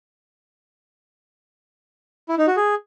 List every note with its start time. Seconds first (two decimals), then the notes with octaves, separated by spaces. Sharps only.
2.29 E4
2.38 D#4
2.47 F#4
2.56 G#4